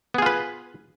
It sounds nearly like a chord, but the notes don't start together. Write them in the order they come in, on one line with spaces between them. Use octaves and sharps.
B3 G#4 F4 B4